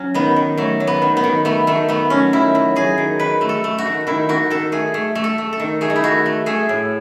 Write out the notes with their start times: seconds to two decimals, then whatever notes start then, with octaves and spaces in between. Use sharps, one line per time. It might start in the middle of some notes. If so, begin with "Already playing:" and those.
Already playing: F#3 C#4
0.14 D#3 B3
0.36 D#3
0.57 F#3 A3
0.80 F#3
0.87 B3
1.02 D#3
1.17 B3
1.24 D#3
1.45 A3 B3
1.67 D#3 A3
1.89 A3 B3
2.10 F#3 C#4
2.33 D#3 E4
2.55 F#3
2.76 F#3 G#4
2.98 D#3
3.19 D#3 B4
3.41 A3
3.49 A4
3.64 A3
3.78 F#4
3.85 D#3
4.07 D#3 E4
4.29 D#3 F#4
4.50 D#3 A4
4.72 A3 G#4
4.94 A3
5.15 A3
5.24 A4
5.38 A3
5.53 A4
5.60 D#3
5.81 A3 G#4
5.90 D#4
5.96 E4
6.03 D#3 F#4
6.26 A3
6.46 A3 G#4
6.69 A2